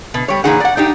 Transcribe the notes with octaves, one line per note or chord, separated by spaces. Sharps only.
B2
G3 C#5
A#2 D#3 E3 D#4 G#4 F#5
D5 F#5
D4 D#4 G4